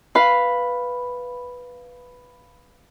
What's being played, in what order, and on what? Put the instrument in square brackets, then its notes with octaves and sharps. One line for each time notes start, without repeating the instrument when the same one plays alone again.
[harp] B4 F5 B5